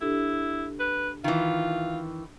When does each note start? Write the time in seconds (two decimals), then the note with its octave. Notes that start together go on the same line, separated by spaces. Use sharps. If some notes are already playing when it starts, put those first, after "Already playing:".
0.01 D4 E4 G4 A4
0.80 B4
1.24 D#3 E3 F4